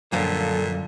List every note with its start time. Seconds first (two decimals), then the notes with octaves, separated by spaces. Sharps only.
0.13 F#2 A#2 D3 F3 G3 A4